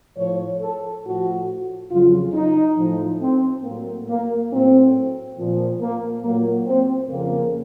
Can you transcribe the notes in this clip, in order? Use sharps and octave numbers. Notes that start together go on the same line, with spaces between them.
A2 F3 C#5
A4
A2 F3 F#4
F2 C#3 F#3 F4
D#4
A2 F3
C4
A2 F#3 A#3
A#3
A2 F#3 C4
A#2 F3
A#3
A#2 F#3 A#3
C4
F2 C#3 F3 A#3